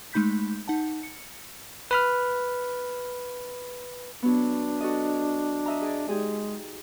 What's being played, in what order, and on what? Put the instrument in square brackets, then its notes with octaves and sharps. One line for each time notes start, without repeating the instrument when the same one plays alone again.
[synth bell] G#3 A3 D#4 B5 G6 B6
D#4 F#5 A5
C#7
[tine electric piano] B4 B5 F6
[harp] F#3 B3 [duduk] D4
[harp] F#4 A4 D#5
D#5 E5 A#5
G#4 D5
[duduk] G#3 [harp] D#4 G4 G#4